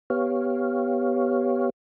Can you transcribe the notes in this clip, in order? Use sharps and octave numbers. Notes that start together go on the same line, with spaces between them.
B3 G4 C#5 F5